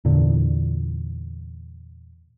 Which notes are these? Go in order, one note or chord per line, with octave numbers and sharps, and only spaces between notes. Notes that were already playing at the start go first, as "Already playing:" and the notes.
E2 A#2 D3